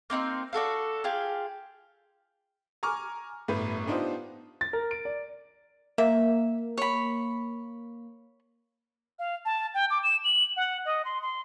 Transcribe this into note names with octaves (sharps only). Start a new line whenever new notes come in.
A#3 C4 D#4 C6
D4 F#4 A4 F5
F4 G4 G#4 F5
G#5 A#5 C#6 D6 F6
G1 A2 B4
B3 D4 D#4 F4 G4 C5
A6
A#4
D7
D5
A#3 E5
C#5 B5
F5
A5
G5
D6
E7
F#7
F#5
D#5
C6
C6